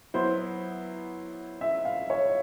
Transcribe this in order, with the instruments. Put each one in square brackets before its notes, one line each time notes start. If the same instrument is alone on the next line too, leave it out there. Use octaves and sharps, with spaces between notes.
[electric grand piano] F#3 B3 E4 [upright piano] C5
[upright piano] E5
F5
C#5